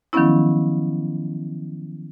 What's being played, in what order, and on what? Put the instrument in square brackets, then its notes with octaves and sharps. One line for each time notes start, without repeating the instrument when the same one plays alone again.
[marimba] D#3 F3 F#3 B3 C#4 E4